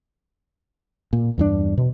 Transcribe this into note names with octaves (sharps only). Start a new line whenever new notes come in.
A#2
E2 G2 D4
B2